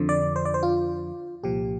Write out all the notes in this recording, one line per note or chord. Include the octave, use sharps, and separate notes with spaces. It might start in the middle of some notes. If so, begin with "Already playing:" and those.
Already playing: F2 D3 F3
D5
C5
D5
C5
F4
C2 A#2 F3 G4